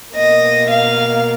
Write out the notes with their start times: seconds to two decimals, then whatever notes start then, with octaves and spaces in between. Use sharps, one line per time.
0.15 B2 A#3 D#5
0.71 F5